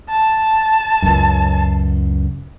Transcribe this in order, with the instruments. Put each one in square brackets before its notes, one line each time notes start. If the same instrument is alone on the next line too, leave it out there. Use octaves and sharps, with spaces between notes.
[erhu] A5
[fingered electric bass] C#2 F#2